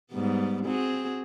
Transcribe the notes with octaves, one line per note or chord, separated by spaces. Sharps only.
G#2 G3 B3
C4 F#4 G#4